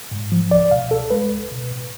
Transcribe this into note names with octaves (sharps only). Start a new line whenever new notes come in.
G#2
F3
C#2 D5
B2 F5
C#2 A4
G#3 B4
C#2
B2
A2